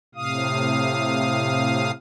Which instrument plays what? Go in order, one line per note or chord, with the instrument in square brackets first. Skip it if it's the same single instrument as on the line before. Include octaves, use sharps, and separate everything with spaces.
[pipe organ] A2 C3 F5 D#6